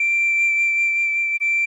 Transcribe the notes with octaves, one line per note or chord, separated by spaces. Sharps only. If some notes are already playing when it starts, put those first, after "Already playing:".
Already playing: D7
D7